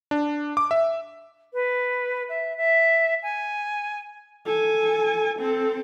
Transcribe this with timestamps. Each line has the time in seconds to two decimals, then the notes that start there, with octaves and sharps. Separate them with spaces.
0.11 D4
0.57 D6
0.71 E5
1.53 B4
2.29 E5
2.57 E5
3.22 G#5
4.45 A4 G#5
5.39 C4 A4